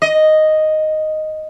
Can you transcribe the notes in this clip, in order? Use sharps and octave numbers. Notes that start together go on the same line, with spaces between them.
D#5